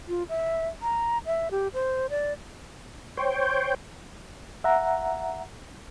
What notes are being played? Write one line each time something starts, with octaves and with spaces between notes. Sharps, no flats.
F4
E5
A#5
E5
G4
C5
D5
C5 C#5 G5
E5 F#5 A#5